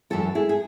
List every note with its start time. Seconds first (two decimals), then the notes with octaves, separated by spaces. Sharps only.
0.10 F#2 E3 G#3 F#4 A4
0.35 E4 G#4
0.49 G#4